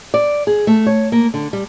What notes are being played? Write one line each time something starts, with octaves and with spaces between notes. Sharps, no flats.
D5
G#4
A3
C#5
A#3
D3
G3